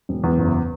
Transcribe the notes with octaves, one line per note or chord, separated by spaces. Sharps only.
E1
E2
F#1